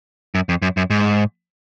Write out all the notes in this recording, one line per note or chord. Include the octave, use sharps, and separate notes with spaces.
F#2
F2
F#2
F#2
G#2